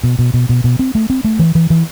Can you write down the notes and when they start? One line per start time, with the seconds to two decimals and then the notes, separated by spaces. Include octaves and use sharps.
0.03 B2
0.19 B2
0.34 B2
0.49 B2
0.64 B2
0.79 C4
0.95 A3
1.10 C4
1.24 A3
1.39 E3
1.55 E3
1.70 E3